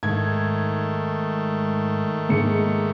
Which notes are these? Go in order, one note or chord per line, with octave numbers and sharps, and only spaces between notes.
G#2 D#3 A3 G#6
G#2 C#7